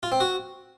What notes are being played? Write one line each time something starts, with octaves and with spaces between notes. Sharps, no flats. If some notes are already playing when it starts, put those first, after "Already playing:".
F4
C4
F#4